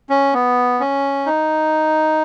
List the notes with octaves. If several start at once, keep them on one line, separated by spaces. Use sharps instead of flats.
C#4
B3
C#4
D#4